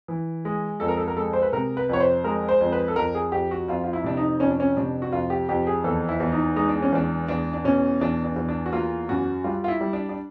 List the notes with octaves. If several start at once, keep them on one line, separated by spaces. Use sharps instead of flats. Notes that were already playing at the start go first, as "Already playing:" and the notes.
E3
G#3
F2 A4
A#4
A4
A#4
G#3 A4
C5
B4
C3 A#4
B4
F2 C#5
C5
G#3 A#4
C5
F2
B4
A4
F2 A#4
G#4
F2 G4
F#4
F2 F4
F4
E4
C3 D4
D#4
F2 C#4
D4
C#4
C3 D4
F#4
F2 F4
G4
F2 G4
G#4
E2 A4
E4
E2
D#4
G#3 D#4
D4
C#4
E2 D4
E2 D4
D4
B2 C#4
E2 D4
D4
E2
D4
F#4
A#3 F4
F#2 F#4
G3 F4
F4
E4
G3
D4
D4